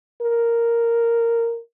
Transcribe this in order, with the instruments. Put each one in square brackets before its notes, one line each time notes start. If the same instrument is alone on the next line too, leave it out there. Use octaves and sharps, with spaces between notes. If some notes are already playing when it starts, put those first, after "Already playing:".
[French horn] A#4